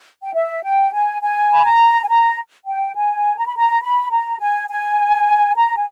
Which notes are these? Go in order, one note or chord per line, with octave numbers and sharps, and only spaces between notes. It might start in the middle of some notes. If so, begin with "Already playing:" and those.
G5
E5
G5
G#5
G#5
B5
A#5
G#5
A#5
G5
G#5
A#5
B5
A#5
B5
A#5
G#5
G#5
A#5
G#5